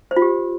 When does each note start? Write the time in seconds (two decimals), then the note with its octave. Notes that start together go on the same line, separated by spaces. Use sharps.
0.11 C5
0.16 F4
0.22 G4